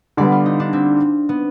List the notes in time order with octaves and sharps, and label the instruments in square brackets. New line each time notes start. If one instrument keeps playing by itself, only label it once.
[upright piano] D3 G3 B3 [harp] D5
[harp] F4
D#4
D4
C4
B3